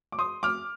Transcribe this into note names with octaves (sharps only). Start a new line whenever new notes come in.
D6
C6 D#6
D6 F6